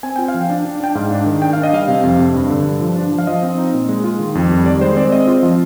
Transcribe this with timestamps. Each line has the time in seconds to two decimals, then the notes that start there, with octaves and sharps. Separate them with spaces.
0.03 C4 G#5
0.16 F4 G5
0.28 F5
0.34 F3
0.41 G5
0.50 D4
0.65 D4
0.80 D4 G5
0.95 G#2 F5
1.11 D4
1.26 D#3
1.42 D4 G5
1.53 D4 F5
1.63 D#5
1.73 G3 F5
1.88 C3
2.03 F2
2.19 C3
2.34 G2
2.50 D3
2.65 G2
2.81 F3
2.96 D4
3.11 F3
3.18 F5
3.27 F3 D#5
3.42 C4
3.58 D#4
3.74 A#2
3.89 G#3
4.04 F4
4.20 D#3
4.35 F2
4.50 G3
4.66 D#3 D5
4.81 G#3 C5
4.96 C4 D5
5.12 C4 D#5
5.27 F4
5.43 F3